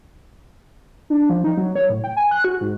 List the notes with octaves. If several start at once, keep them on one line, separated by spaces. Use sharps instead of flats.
D4
F3
D#4
F#3
C#5
A2
G5
G#5
F#6
F#4
G#2